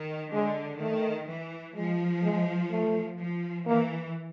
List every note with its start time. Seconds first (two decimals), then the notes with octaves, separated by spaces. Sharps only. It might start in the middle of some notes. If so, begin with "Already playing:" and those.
Already playing: D#3
0.32 D3 G#3
0.80 D#3 A3
1.29 E3
1.76 F3 G#3
2.23 G#3
2.71 A3
3.19 F3
3.66 E3 A#3